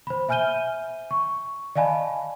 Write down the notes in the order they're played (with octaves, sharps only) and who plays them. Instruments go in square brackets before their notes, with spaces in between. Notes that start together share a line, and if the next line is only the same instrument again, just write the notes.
[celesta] C5 B5
E5 G#5 F6 G6 D#7 G7
C#6
D5 D#5 F5 G#5 A5 B5